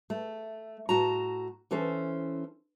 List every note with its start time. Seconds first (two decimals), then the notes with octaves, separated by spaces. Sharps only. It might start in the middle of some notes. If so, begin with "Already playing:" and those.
0.10 A3
0.89 A2 F#4 A5 A#5
1.71 E3 C#4 A4 C5